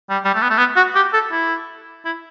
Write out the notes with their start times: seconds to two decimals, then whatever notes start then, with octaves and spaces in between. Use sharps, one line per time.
0.10 G3
0.25 G3
0.34 A3
0.42 B3
0.50 A3
0.58 B3
0.76 F#4
0.95 G4
1.13 A4
1.32 E4
2.05 E4